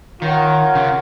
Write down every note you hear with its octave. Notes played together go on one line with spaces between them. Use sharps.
D#3 F4 A#4 C#5 F#5
C#3